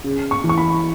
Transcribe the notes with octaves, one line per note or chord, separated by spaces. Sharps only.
C#3
C#6
E3
C#6
B5